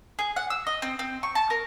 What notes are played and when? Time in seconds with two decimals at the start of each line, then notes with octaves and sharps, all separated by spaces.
0.19 G#4
0.36 F#5
0.50 E6
0.67 D#5
0.82 C4
0.99 C4
1.23 C#6
1.35 A5
1.50 A#4